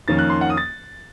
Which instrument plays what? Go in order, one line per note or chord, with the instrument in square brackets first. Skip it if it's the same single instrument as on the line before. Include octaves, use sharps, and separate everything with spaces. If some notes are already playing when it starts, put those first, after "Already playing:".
[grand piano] F2 D#3 A#3 C#4 A6
F#6
C6
F#5
D#6
A6